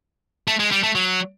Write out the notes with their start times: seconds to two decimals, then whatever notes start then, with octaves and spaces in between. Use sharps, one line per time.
0.48 A3
0.59 G#3
0.71 G3
0.83 A3
0.95 F#3